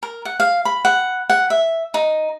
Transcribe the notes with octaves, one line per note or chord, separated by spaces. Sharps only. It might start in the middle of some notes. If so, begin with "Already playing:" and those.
A#4
F#5
F5
B5
F#5
F#5
E5
D#4